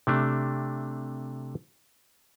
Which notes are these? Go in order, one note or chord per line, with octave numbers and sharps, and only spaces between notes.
C3 A3 D4